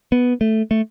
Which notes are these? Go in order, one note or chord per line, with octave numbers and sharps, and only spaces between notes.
B3
A3
A3